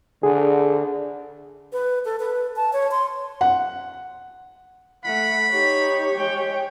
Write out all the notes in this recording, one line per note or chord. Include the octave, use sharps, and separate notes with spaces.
D3 G#4
B4
A4
B4
A5
C#5
C6
F#5
A3 F#5 B5
D#4 G4 C#5
G#3 G5